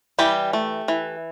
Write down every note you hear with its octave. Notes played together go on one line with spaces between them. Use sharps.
E3 G3 G4
A3
E3